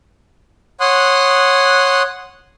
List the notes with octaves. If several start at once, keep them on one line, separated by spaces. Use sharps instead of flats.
C#5 F#5 C6 D#6 F#6